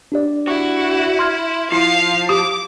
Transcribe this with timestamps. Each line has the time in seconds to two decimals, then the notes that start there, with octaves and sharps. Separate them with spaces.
0.12 D4 G4 D5
0.48 E4 F#4
1.19 C6 F6 G#6
1.72 F3 E4 F5
2.29 G4 D6